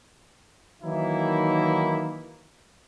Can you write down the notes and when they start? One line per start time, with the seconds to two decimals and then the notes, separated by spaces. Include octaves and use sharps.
0.83 D#3 E3 F#3 A#3 D#4 E4